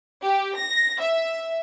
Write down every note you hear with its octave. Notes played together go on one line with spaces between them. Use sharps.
G4
A#6
E5